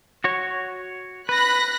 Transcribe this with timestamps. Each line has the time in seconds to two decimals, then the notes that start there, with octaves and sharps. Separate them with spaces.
0.24 F#4 C#5
1.29 B4 B5 F#6 A#6